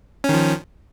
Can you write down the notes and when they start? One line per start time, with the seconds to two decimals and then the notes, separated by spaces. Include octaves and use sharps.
0.24 C#4
0.29 D#3
0.34 F3